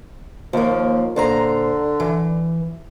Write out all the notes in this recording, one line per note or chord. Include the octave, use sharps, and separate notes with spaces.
D#2 F3 A#3
A#2 D3 C5 A#5
E3